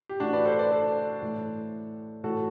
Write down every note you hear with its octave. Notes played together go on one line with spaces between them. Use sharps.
G4
A2 E3 D4 F#4
B4 D5
A4 C5
B4 D5
A4 C5
A2 E3
A2 E3 F#4 A4